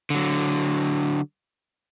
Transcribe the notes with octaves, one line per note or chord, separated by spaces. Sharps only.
D3 F#3